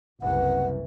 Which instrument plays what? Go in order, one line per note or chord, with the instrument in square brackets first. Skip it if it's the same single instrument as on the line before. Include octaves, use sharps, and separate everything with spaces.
[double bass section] F#1 C2 [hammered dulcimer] E3 [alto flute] F#5